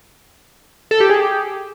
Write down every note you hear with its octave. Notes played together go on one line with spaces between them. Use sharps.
A4
G4
G#4
G4